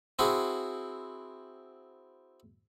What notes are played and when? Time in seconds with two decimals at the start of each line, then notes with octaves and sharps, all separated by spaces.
0.19 C4 E4 F#4 G#4